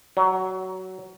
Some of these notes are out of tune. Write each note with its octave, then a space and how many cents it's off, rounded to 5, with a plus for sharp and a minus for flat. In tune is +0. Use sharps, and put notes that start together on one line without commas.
F#3 +15